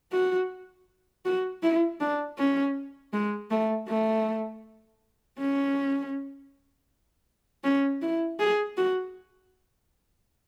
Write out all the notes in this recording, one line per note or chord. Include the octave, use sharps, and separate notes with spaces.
F#4
F#4
E4
D4
C#4
G#3
A3
A3
C#4
C#4
E4
G#4
F#4